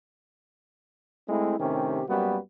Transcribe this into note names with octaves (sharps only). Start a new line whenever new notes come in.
G#3 A3 C4 E4
A2 C3 D#3 C#4 G4
F#2 G3 A#3 B3 F#4